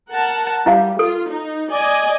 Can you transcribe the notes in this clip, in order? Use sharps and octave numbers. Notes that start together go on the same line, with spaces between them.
A#4 F#5 A5
G3 E4 E5 F5
F4 A4
D#4
D5 D#5 G#5